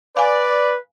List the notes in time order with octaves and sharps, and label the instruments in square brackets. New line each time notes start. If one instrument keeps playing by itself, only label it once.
[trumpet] B4 [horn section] D5 [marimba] F5 G#5